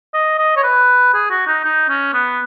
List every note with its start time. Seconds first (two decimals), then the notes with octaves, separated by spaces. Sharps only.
0.14 D#5
0.39 D#5
0.57 C#5
0.63 B4
1.14 G#4
1.31 F#4
1.47 D#4
1.65 D#4
1.89 C#4
2.14 B3